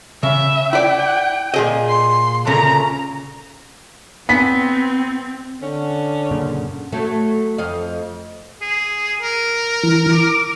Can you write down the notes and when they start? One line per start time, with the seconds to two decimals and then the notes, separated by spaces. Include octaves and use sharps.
0.23 C#3 E5
0.73 E4 D5 G5
1.54 A#2 G#4 D#5
1.89 C6
2.47 D2 A#2 C#3 A#5
4.29 B3 C4 B6
5.62 D3 C#4
6.31 F#2 A#2 C#3
6.92 F#3 A3
7.58 F2 D#5 F5
8.61 G#4
9.22 A#4
9.83 E3
10.11 D6